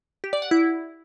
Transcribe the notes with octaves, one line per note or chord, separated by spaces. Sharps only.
G4
D5
F#5
E4